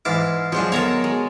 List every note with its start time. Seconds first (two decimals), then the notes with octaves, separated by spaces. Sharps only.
0.05 G#2 E3 D6 F6 A6 C7
0.52 F3 F#3 G#3 D4
0.72 B3 A4 A#4 C#5 A#5 A6
1.04 G#3